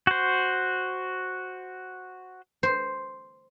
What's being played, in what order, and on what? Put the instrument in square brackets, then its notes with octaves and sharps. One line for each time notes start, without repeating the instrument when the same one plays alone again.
[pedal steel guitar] F#4 C5
[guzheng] C5